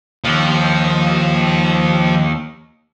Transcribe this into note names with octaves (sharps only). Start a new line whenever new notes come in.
D#2 F3